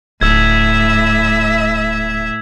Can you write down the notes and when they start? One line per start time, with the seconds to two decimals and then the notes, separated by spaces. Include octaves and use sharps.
0.21 D1 A2 E5 E6 G#6